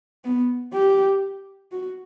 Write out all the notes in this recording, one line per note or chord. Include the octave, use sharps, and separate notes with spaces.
B3
G4
F#4